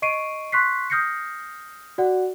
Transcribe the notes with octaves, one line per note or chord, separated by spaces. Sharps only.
D#5 C#6 C7 D7 D#7
C6 C#6 F#6 B6 C7
D#6 F6 G6 A#6 C7 C#7
F#4 D5 F#5